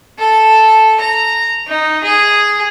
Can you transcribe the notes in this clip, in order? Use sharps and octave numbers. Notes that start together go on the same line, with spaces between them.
A4
A#5
D#4
G#4